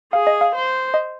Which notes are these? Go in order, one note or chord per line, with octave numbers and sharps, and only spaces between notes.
G#4 F5
D#5
F5
C5
D#5